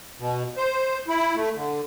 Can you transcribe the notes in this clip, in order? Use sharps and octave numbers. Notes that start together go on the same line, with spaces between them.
B2
C5
E4
A3
D3